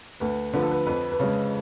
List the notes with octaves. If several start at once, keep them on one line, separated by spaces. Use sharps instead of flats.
D2 B4
D3 F3 B4
A4
B4
F2 B4
B4
C#3 G#3 C#5